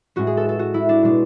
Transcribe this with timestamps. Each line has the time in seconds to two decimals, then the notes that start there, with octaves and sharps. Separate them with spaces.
0.16 A2 G#3 C#4 F#4
0.27 G#4
0.37 A4
0.49 A4
0.59 F#4
0.74 E4
0.89 D4
1.03 B2 G#3 D4